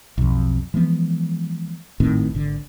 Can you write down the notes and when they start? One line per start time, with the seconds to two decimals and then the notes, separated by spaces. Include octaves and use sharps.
0.18 B1 F2
0.74 E3 F3 G#3 B3
2.00 G#1 A2 D#3 C4
2.35 G#1 D3